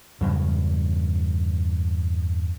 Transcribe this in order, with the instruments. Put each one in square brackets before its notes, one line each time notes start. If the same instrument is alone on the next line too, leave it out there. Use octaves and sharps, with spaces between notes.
[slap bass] E2 G2 C#3 F#3